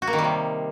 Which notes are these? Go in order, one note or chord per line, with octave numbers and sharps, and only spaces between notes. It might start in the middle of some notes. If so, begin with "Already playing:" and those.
F#4
A#3
D#3
G3
C3